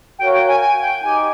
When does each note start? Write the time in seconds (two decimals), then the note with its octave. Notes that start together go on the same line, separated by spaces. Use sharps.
0.19 F#4 A#4 C#5 F5 G5
0.33 G5
0.47 G#5
0.60 G#5
0.81 G5
1.02 D#4 G4 G#5